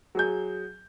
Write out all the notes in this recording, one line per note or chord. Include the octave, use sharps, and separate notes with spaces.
F#3 G#4 G6